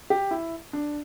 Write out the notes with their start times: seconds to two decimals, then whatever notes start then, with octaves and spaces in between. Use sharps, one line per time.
0.10 G4
0.31 E4
0.73 D4